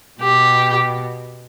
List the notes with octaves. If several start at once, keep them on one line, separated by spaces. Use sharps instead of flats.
B2 G4